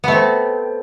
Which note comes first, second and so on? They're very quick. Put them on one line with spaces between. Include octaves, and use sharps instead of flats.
B3 A3 C4